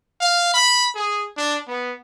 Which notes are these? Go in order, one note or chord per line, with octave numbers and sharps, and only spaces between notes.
F5
B5
G#4
D4
B3